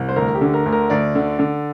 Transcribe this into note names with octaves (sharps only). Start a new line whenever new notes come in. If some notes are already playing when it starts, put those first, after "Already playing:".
Already playing: C2
C5
D2 A#4
G4
D3
A#4
D2
A#4
D2 D5
D3
D3